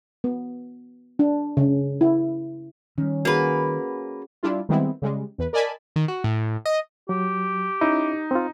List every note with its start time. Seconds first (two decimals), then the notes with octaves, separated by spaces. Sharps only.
0.24 B3
1.19 D4
1.57 C#3
2.01 E4
2.98 D#3 G3 C#4
3.25 A#3 F#4 G#4 B4
4.43 G3 D4 E4 F4
4.69 D#3 G3 G#3 B3 C4 E4
5.02 C#3 G3 G#3
5.38 E2 B4
5.53 A#4 D5 D#5 G#5 A5 B5
5.96 D#3
6.08 F#4
6.24 A2
6.66 D#5
7.09 F#3 G4
7.81 C#4 D#4 E4
8.31 C4 F4